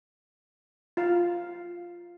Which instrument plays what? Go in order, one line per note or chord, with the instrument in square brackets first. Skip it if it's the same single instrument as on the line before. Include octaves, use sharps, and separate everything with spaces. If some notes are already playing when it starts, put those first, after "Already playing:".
[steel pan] F4 F5